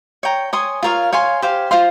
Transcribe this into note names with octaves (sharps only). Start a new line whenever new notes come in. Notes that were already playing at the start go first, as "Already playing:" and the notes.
C#5 G5 A#5
C#5 G#5 C6 D#6
F4 A#4 C#5 F5
C#5 F5 G#5 C6
G4 C5 F5
F4 C5 F5 C6